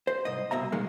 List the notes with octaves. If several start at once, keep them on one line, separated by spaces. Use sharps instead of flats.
C5
C2 G#2 D#5
C2 B2 E5 A#5
G2 A#2 D#3 G#3 A#3